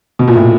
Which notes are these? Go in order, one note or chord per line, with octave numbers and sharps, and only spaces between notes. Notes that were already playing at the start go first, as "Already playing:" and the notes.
B2
A#2
A2